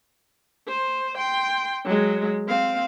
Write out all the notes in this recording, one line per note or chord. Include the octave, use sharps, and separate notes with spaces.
C5
G5 C6
F#3 G#3
C4 F5